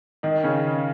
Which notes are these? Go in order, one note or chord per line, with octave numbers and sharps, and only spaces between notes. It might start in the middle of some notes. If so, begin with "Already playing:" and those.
D#3 D#4
C#3 C#4